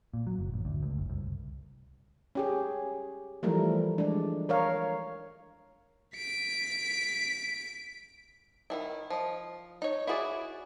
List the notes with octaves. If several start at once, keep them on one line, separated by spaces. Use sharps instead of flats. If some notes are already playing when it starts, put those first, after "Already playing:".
A#2
F#3
F#1
A1
D2
C#2
F#1
C2
C#4 G4 G#4
E3 F3 G3 A3 A#4
G#3 D4
A#4 C#5 F5
B6 D7
D#3 E3 E4
F3 D#5
D#4 C#5
E4 F#4 G#4 C5 D5